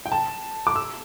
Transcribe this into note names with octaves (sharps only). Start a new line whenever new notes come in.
G5
A5
D6
E6